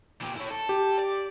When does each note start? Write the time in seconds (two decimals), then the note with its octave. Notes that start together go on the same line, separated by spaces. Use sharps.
0.22 A#2 G4
0.36 E4 C#5
0.51 A4
0.69 G4
0.99 D5